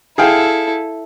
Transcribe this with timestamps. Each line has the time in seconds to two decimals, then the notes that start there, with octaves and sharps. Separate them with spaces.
0.18 E4 G#4 A4 F5 G5